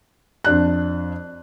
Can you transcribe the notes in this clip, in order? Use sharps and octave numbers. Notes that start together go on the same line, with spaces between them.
F2 D4 F#6